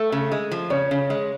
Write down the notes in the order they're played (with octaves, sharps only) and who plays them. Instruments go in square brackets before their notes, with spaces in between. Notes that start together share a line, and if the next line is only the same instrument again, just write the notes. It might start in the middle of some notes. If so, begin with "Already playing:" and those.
Already playing: [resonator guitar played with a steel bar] A3
C#3
G#3
F3
[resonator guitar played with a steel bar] C#3 [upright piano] C#5
[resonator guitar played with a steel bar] C#3
G#3